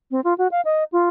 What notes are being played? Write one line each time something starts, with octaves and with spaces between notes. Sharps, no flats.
C4
F4
F#4
F5
D#5
F4